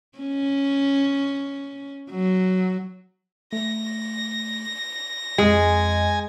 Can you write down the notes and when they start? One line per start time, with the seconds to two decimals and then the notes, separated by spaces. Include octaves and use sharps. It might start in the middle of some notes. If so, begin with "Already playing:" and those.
0.19 C#4
2.11 F#3
3.53 A3 A#6
5.38 F2 G#3 D#5 G#5